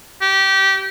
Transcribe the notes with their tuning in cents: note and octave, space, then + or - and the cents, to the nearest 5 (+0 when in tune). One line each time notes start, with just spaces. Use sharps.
G4 -20